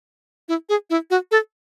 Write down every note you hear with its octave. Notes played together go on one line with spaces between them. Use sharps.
E4
G#4
E4
F#4
A4